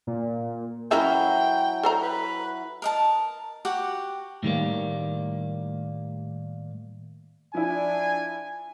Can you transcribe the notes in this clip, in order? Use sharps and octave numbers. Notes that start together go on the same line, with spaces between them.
A#2
E3 F#3 C#4 E4 A#4 E5 G5
A4 C5 A#5
B4
A#4 D#5 A5
F#4 G4 F#5 D6
A2 D#3 G3 A#3
F3 D4 E4 G#5